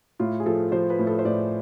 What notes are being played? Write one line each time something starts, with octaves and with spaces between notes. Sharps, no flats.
A2 F4
G#4
F3 A4
F3 C5
B4
A2
A4
C5
A2 D5